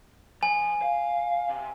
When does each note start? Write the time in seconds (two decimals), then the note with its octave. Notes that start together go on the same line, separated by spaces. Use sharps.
0.43 F3 G#5
0.82 F5
1.49 C3